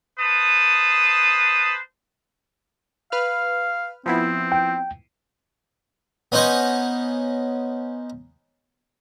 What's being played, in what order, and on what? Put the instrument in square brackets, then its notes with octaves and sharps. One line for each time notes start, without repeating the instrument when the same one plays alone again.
[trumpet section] B4 C5 A5 D#6
[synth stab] B4 F6 [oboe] F5
[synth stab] F3 B3 E4 [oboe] C4
[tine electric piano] G5
[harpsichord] B3 C#4 D#4 C5 C#5 D#5